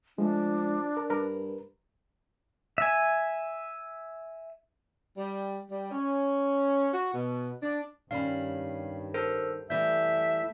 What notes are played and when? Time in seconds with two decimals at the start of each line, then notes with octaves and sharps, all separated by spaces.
0.18 F3 G#3 A3 D4
0.97 A#4
1.10 G2 A#4 B4
2.78 E5 G#5
5.17 G3
5.70 G3
5.92 C#4
6.93 F#4
7.14 B2
7.62 D4
8.11 G2 D#3 G3 C#4 F5 B5
9.14 A4 A#4 C5
9.70 E3 G3 A3 E5 G6